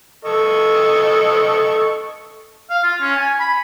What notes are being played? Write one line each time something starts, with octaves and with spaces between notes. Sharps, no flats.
A4 D#5 C#6
F5
F4
C#4
G#5
B5